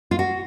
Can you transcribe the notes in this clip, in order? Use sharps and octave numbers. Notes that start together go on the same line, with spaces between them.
F4
F#4